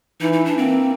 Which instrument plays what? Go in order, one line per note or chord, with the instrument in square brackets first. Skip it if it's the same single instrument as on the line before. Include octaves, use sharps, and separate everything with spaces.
[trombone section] E3 [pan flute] D#4
[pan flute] D#4
D4
[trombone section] A#3 [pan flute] C4